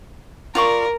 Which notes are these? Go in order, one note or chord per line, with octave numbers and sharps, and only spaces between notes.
F4 A#4 D5 C#6